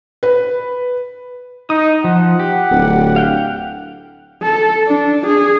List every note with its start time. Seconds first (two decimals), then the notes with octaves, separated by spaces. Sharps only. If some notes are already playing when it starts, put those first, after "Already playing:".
0.23 B4
1.70 D#4 D#6
2.04 F3 F#5
2.40 G4
2.71 D1
3.16 F5 G5 F#6
4.43 A4
4.87 D4
5.27 G#4